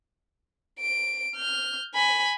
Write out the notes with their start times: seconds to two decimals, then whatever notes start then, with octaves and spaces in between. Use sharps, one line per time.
0.80 D7
1.36 F6 G6
1.95 G#5 B5